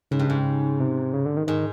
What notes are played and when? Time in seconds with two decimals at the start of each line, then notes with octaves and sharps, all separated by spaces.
0.11 G#2 C#3
0.19 G2
0.30 G#2
0.80 C3
1.13 C#3
1.26 D3
1.37 D#3
1.47 G#2 D#3